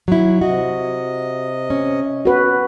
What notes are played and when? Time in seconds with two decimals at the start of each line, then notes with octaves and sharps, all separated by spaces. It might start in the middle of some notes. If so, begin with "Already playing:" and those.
0.08 F#3 E4
0.41 C3 F#4 D#5
1.70 C#4
2.25 F#4 B4